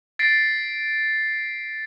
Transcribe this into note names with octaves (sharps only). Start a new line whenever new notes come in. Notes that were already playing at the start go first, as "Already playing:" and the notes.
A6 B6 C7 D7